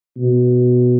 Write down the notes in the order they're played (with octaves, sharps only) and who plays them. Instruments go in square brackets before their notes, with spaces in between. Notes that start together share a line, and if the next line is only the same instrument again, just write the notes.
[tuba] B2